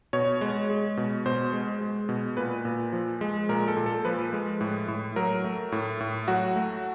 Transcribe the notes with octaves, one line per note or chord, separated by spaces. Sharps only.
B2 C#5
G#3
G#3
B2
B2 C5
G#3
G#3
B2
A#2 B4
A#2
F3
G#3
A#2 A#4
A4
A#2
A4
F3 B4
G#3
A2
A2
F#3 A#4
A3
A2
A2
F#3 F#4
A3